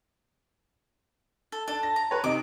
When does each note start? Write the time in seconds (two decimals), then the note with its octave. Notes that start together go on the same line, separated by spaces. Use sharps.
1.52 A4
1.68 D4 A4
1.83 A#6
1.96 A#5
2.11 B4 C#5
2.24 C3 D#4 D6